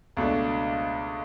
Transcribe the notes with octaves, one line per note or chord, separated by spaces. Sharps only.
C#2 B2 A3 D4